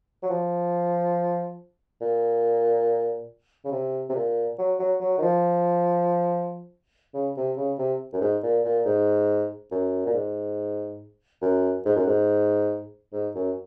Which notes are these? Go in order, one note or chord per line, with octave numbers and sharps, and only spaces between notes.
F#3
F3
A#2
C#3
C3
C3
A#2
F#3
F#3
F#3
D#3
F3
C#3
C3
C#3
C3
F#2
G#2
A#2
A#2
G#2
F#2
A#2
G#2
F#2
G#2
F#2
G#2
G#2
F#2